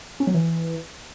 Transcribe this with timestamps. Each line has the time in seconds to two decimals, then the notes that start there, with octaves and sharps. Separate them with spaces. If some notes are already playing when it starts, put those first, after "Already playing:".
0.20 C#4
0.27 F#3
0.34 E3